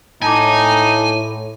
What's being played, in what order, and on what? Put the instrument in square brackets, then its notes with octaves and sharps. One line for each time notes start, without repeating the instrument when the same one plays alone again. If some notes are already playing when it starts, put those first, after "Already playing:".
[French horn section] A2 [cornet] D#4 [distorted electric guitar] G#5 [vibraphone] A5 D6